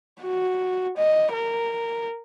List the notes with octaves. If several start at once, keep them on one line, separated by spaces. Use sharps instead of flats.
F#4
D#5
A#4